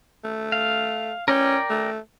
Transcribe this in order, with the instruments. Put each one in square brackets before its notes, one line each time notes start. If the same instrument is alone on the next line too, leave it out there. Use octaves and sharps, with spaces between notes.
[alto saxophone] A3
[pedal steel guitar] F5
[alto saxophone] C#4 [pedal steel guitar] A#4 D5 G5
[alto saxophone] A3